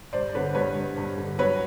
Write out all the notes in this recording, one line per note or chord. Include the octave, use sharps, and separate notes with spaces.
G2 C5 D5
D3 B4 C#5
G2 B4 C#5
G2
G2
D3
F#3 B4 C#5